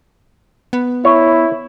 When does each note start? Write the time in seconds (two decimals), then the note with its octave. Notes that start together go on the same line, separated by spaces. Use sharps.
0.73 B3
1.05 E4 C#5